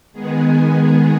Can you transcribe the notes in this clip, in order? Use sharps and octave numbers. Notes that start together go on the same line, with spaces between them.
D#3 G#3 B3 G#4